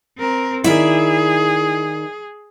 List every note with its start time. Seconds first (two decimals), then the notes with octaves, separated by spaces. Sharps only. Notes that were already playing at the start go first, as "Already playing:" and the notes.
0.18 C4 A#4
0.64 D#3 E4 G#4 D5 E5